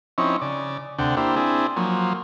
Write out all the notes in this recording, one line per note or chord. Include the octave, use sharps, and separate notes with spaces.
F3 C4 C#4 D#4 E4 C#6
C#3 D5
D2 C3 D4 F#5 G5
A#3 D4 E4 G4 C5
C4 D4 E4 G#4
F3 F#3 A#3